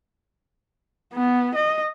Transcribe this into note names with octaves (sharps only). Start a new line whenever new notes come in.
B3
D#5